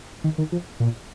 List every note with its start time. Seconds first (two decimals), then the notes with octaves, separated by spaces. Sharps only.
0.24 D#3
0.38 D#3
0.52 F3
0.80 A#2